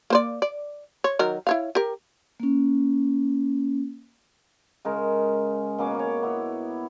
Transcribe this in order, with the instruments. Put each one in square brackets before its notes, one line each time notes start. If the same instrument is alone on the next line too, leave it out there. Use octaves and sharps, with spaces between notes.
[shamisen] A#3 C5 D5
D5
C#5
D#3 F#3 A#4
E4 C#5 F5
G4 A#4
[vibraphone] A#3 C#4
[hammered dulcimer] C#3 G#3 A#4
B2 A#3 C#4 D6
C#5 D6
B3 E4